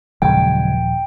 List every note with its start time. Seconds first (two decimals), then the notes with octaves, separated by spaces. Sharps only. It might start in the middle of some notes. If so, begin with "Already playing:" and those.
0.22 F#1 D#2 A#2 F3 G#3 G5